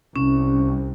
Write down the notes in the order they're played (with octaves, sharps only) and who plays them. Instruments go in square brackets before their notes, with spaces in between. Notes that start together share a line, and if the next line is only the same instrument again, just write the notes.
[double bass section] C2 [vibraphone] C#4